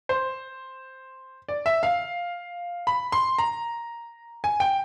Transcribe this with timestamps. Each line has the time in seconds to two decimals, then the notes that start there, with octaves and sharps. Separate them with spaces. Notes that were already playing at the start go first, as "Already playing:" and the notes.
0.09 C5
1.49 D5
1.66 E5
1.83 F5
2.87 B5
3.12 C6
3.38 A#5
4.44 G#5
4.60 G5